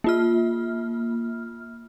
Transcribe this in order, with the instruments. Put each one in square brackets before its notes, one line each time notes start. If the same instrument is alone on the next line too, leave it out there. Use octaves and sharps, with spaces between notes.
[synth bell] A#3 F4 F6